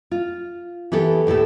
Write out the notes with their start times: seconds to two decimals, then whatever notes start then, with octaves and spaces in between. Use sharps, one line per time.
0.11 F4
0.92 E3 B3 G4 A4
1.27 D2 A2 G4 A4